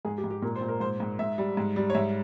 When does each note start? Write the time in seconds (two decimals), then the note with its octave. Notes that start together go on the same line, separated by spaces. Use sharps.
0.05 G#2 G#4
0.18 G4
0.24 G#2
0.30 G4
0.42 A#2 A#4
0.56 C5
0.61 A#2
0.68 A#4
0.80 G#2 C5
1.00 G#2
1.19 G#2 E5
1.38 G3
1.57 G#2
1.76 G3
1.90 C#5
1.95 G#2 E5